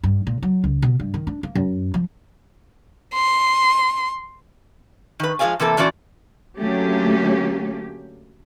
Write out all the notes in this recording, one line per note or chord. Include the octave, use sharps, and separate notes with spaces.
G2
A#2
F#3
C#2
B2
G2
D#3
D4
A#3
F#2
F3
C6
D#3 B4
F3 G#3 G#4 D5 F5 G#5
C3 E3 A#3 A4
A#2 E3 C#4 F#4 D5
D3 F#3 A3 A#3 C#4 G4